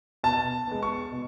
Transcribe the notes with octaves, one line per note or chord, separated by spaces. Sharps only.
B2 A5
G#3 B3
C#6
B2